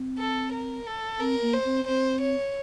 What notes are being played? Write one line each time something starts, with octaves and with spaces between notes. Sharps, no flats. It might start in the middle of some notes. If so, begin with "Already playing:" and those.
Already playing: C4
A4
A#4
A4
C4 A#4
A#3
C5
C4
C4 C5
C#5